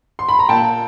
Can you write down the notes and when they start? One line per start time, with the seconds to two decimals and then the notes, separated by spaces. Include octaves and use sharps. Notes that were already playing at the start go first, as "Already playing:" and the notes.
0.19 C6
0.29 B5
0.39 A#5
0.49 A#2 G5 A5